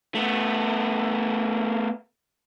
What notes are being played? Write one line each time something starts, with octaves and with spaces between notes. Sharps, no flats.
A3 B3